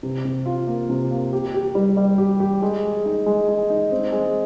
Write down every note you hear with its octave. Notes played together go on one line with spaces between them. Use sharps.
C3
C3
F4
A#3
C3
A#3
G4
G4
G3
G3
G4
G4
G#3
G#4
D#4
G#3
G#3
D#4
C4
G#3